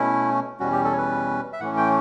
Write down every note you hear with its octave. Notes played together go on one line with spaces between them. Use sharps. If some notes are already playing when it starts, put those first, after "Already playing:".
Already playing: B2 A3 C#4 E4
E2 B2 G3 C#4 F#4
G4
A4
C#5
B4
E5
A2 E3 A3 C#4 F#5
G5